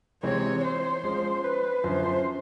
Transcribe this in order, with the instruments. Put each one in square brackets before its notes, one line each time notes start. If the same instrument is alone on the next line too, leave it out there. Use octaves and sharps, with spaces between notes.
[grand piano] C3 E3 G#3 C4 [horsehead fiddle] C#5
[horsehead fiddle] C5
[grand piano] F3 G#3 C#4
[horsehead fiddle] B4
[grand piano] F#2 D3 F3 [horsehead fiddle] C5